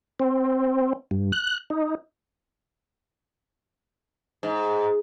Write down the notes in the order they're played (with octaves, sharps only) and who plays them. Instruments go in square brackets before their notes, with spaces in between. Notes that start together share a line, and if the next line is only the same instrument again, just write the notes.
[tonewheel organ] C4
G2
F#6
D#4
[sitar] G#2